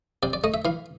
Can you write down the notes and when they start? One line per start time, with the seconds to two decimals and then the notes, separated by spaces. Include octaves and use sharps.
0.23 C3 D5
0.33 D5
0.44 A3 D#5
0.54 E5
0.65 E3 F5